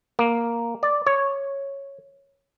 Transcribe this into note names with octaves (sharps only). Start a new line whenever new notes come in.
A#3
D5
C#5